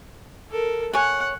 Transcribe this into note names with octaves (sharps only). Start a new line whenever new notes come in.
A4 A#4
C#5 F#5 G#5